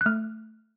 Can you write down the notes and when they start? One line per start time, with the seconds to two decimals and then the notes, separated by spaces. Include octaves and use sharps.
0.01 F#6
0.06 A3 F6